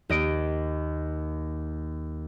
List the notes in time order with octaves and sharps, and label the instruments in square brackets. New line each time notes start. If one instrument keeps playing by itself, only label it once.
[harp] D#2 D#5 D7